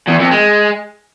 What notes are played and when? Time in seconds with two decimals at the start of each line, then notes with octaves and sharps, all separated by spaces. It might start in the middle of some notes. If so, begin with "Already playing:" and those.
0.08 E2
0.20 F2
0.32 G#3